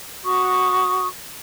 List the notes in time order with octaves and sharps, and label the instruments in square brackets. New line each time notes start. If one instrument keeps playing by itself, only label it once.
[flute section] F#4 C#6 D#6